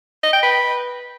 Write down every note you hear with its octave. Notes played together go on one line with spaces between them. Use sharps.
D#5
G5
B4